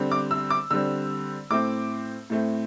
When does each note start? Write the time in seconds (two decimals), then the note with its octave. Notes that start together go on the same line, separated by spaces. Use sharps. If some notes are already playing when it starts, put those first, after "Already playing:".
Already playing: D3 G3 C4
0.11 D6
0.31 E6
0.50 D6
0.71 D3 G3 C4 E6
1.50 A2 A3 C4 D6
2.30 A2 A3 C4